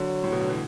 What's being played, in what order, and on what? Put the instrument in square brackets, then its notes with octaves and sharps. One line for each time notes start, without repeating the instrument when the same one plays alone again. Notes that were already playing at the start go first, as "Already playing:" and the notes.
Already playing: [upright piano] D3 [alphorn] F#3
[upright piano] A2
B2
D3
E3